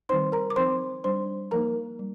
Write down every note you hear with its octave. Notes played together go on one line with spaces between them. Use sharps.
D#3 G3 C4 D#4 C5 C6
A#4 A#5
D6
F3 C4 D#4 C5 C6
G3 D4 C5 C6
F3 A#3 D#4 A#4 A#5
G3